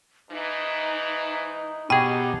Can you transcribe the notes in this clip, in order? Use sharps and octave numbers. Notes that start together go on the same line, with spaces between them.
G#2 E3 D#4
F2 B2 F#3 D#4 G4 G#4 G5